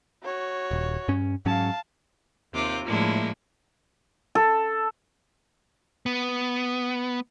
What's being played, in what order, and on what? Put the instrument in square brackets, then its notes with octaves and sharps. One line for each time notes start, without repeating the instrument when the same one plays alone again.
[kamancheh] F#4 C#5
[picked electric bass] D#1
G2 C#4
[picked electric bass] G#2 F#3 C#4 [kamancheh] F5 A5
[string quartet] D#2 C3 F4 D6
A2 F3 G#3 A#3 D4 E4
[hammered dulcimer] A4
[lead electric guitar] B3